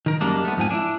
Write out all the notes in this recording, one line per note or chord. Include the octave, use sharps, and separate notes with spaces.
D#3 A#4
F#2 G3 A#3 D4 D#4
A3 B3
F2 G#2 F3 G#5
D4 E4